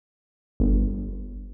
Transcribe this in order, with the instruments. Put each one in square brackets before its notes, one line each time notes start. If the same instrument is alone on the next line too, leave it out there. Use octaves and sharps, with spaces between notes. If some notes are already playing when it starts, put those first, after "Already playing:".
[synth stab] G1